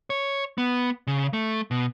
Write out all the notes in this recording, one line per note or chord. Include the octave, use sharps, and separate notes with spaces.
C#5
B3
C#3
A3
B2